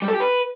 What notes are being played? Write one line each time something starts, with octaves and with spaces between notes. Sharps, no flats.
G3
A4
G4
B4